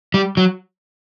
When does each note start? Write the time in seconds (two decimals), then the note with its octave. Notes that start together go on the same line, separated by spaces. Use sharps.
0.14 G3
0.37 F#3